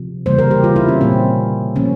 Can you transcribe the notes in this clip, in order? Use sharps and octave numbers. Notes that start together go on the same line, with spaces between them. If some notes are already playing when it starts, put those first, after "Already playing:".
Already playing: C3 F3
C#3 E3 G3 A#3 C5
A#4
G4
F4
E4
C#4
A#2 G3 A#3 C4
C3 F3 A#3 C#4